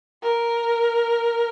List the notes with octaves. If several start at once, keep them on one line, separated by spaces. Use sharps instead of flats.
A#4